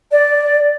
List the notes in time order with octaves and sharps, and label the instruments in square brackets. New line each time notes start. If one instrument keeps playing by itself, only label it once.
[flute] D5